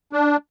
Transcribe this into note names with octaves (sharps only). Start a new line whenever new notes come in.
D4